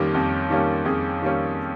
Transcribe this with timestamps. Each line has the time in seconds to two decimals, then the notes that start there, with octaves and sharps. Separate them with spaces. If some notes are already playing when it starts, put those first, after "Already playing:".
Already playing: F2 D#3 G3 A#3 C#4 G4
0.14 F2
0.50 D#3 G3 A#3 C#4
0.85 F2 G#4
1.22 D#3 G3 A#3 C#4